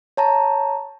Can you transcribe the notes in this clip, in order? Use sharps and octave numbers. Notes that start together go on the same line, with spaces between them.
C#5 A5 A#5